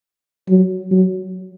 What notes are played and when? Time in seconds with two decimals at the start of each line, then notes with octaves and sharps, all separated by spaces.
0.49 F#3
0.91 F#3